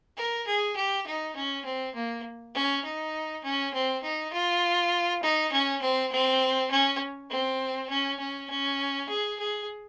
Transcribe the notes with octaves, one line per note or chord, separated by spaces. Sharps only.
A#4
G#4
G4
D#4
C#4
C4
A#3
C#4
D#4
C#4
C4
D#4
F4
D#4
C#4
C4
C4
C#4
C4
C#4
C#4
C#4
G#4
G#4